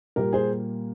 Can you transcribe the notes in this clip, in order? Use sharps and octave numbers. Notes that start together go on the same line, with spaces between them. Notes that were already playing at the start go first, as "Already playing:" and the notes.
A#2 G3 A#3 G4 A#4
G#4 C5